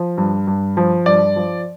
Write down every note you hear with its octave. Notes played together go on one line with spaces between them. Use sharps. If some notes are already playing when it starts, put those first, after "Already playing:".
Already playing: F3
G2
G2
F3
G2 D5
F3